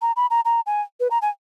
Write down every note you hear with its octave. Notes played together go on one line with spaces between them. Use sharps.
A#5
B5
A#5
A#5
G#5
B4
A#5
G#5